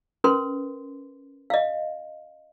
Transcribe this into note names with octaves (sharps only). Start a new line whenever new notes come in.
C#4 A#4 B4 C6
D#5 F5